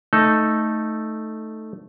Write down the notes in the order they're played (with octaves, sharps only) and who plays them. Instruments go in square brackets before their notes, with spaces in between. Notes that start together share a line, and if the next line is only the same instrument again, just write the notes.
[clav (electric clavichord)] A3 D#4 A4